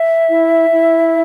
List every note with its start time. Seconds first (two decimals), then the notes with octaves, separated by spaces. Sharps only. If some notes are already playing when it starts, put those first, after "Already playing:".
Already playing: E5
0.27 E4
0.70 E4